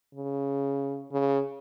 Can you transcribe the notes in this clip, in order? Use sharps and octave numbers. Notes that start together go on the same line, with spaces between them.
C#3
C#3